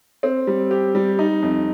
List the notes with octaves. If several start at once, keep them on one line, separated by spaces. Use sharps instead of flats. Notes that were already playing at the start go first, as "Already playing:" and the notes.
C4
G3
G4
G3
D#4
F2